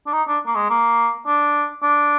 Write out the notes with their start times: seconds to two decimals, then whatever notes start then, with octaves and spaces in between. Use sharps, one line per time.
0.07 D4
0.13 D#4
0.28 D4
0.46 A#3
0.56 G#3
0.70 A#3
1.27 D4
1.83 D4